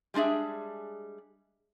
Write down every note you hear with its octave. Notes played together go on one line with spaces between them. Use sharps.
G3 G#3 D4 G#4 E5